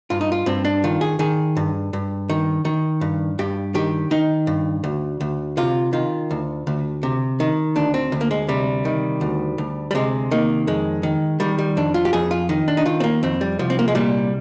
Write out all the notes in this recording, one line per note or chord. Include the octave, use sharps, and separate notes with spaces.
G2 F4
D#4
F4
G2 C4
D4
D#3 F4
G#4
D#3 G#4
G2
G2
D#3
D#3
G2
G2 G4
D#3 G4
D#3 D#4
G2
D2
D2
C3 F4
D#3 F4
D2
D2
C3
D#3
D2 D4
C4
D2
A#3
G#3
C3 G3
D#3
D2
D2
G3
C3 G#3
D#3 A#3
F2 G#3
D#3
D#3 G3
G3
F2 D4
F4
G4
F2 G#4
F4
D#3 D#4
D4
D#4
D#3 F4
C4
A#3
F2 C4
G3
C2 F3
C4
A#3
G#3
A#2 G3